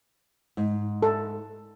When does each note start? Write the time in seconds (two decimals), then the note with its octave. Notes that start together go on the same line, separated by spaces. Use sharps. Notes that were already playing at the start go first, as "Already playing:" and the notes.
0.57 G#2
1.03 A4